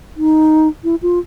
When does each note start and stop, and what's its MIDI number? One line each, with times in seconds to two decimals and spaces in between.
0.17 0.68 63
0.84 0.95 64
1.02 1.19 65